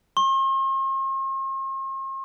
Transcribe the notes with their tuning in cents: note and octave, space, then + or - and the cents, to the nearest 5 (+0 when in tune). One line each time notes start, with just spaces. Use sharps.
C6 +45